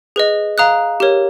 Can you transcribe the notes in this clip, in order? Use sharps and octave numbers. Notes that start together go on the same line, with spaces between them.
G#4 B4 D#5
F5 A#5 D#6 F#6
G4 A#4 C#5